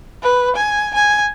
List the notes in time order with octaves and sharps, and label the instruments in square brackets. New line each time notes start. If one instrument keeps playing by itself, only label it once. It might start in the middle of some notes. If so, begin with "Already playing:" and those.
[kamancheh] B4
G#5
G#5